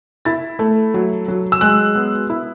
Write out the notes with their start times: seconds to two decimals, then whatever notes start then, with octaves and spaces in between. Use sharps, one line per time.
0.25 E4 A6
0.59 A3
0.94 F#3
1.28 F#3
1.52 E6
1.61 G#3 F#6
1.95 B3
2.30 E4